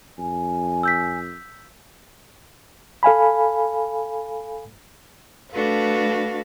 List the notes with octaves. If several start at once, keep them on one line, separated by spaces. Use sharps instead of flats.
F2 G#5
E6 G6 B6
A4 F5 G#5 B5
A3 D4 F#4 A4 B4 F5